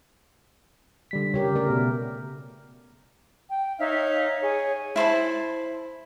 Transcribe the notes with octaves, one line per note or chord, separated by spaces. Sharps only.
D3 G3 B6
C#3 G4 A#4 C#5
A3 A#4 D5
B2 B3
G5
D#4 C#5 E5 F5
G#4 C#5
E4 C5 A5 B5